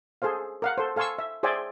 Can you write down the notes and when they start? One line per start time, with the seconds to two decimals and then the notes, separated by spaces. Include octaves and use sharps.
0.22 G#4 A4 C5 F5
0.62 A#4 F5 F#5
0.78 A4 C5
0.96 A4 F5 G#5 C6 C#6 E6
1.19 E5
1.43 G#4 C5 D5 E5 G5 G#5